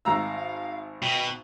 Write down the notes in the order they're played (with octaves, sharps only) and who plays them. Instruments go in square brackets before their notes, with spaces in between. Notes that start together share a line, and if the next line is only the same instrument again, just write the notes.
[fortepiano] G#1 A#5 E6 [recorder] F5
[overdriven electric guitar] B2 [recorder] G5